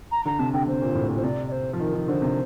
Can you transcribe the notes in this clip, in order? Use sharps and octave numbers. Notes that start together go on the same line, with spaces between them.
A#5
D3 A#5
C3 A5
D3 G5
C3 C5
A#2
A2
A#2
C5
C3 D5
D5
C5
F3
D#3 A#4
D#3
D3 C5
C3